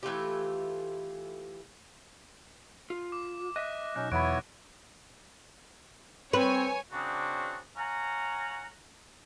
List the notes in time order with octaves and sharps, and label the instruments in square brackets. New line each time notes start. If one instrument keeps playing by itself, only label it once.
[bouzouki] E3 A3 F4 G4
[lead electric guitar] F4
[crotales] D6
[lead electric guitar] D#5 E5 [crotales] F#6 A#6
[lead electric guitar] B1 [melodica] C#4 D#4 [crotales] F#6
[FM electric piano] E2 B5 [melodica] B3 E4 C#5 [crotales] C#6 F#6 D7
[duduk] C4 [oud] B4 [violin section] C#5 G#5
[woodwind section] C#3 C4 D4 F#4
C#5 F5 F#5 G#5 A#5